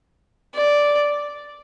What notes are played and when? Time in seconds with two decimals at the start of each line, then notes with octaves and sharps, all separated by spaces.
0.55 D5